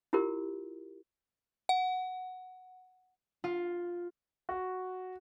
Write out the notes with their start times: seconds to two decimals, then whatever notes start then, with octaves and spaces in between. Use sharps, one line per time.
0.13 E4 F4 G4 A#4
1.69 F#5
3.44 F4
4.49 F#4